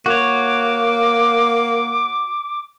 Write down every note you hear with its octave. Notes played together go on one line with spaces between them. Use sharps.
A#3 F#4 C#5 D6